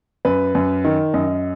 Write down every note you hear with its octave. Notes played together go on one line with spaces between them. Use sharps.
F#2 B4
F#2
D#3
F#2 D#5